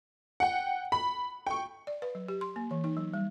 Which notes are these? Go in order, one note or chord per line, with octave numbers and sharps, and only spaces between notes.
F#5 G5
B5
G5 C#6
D5
B4
F#3
G4
C6
A#3
E3
D#4
F#3
G3